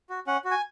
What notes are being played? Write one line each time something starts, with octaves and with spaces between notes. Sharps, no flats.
F#4
C#4 F#5
F#4
G#5